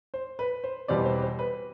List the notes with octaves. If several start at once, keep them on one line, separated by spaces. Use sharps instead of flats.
C5
B4
C5
E2 B2 G3 C4 D5
C5
C5
B4